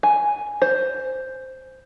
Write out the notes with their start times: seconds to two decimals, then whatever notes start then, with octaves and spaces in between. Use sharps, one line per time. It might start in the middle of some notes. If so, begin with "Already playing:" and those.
0.03 G#5
0.62 C5